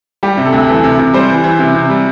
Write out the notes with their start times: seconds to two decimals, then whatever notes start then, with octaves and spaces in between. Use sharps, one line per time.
0.23 G3 G4
0.37 C3
0.45 A4
0.53 D2
0.68 E3 A4
0.84 C3
0.99 C3
1.14 G3 C5
1.29 E3
1.44 E3
1.59 C3
1.75 C3
1.90 G3